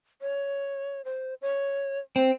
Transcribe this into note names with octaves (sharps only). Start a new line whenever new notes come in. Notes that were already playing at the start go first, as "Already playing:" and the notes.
C#5
C5
C#5
C4